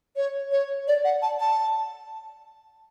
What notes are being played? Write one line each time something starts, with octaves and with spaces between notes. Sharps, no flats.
C#5
C#5
D5
F#5
A5
A5